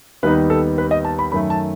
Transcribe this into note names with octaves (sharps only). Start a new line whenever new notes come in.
D#2 D#3 G3 B3 D#4 B4
A4
B4
D#5
A5
B5
F#2 D#3 A3 B5
A5